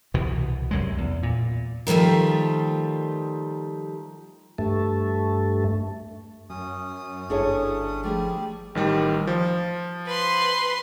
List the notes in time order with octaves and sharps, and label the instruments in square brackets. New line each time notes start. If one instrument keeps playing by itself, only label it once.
[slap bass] C2 B2 E3
C2 F#2 G#3
E2
A#2
[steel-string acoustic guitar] D#3 F3 G3 A3 F4
[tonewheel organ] G2 A3
[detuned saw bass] F#2 [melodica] C#4 D#6
[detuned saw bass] G1 [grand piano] D4 E4 A4 [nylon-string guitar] F#4 G#4 C#5
[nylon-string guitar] F3 A3 G#4 [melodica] G3 G4
[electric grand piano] A1 D#3 G3
F3
[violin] B4 C6